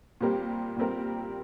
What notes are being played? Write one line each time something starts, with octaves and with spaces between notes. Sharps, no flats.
A#2 G3 C4 G4 A#4
A#2 G3 C4 G4 A#4